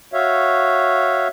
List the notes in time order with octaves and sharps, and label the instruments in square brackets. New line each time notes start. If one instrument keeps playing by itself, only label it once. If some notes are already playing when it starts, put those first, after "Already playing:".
[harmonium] F#4 C#5 E5 F5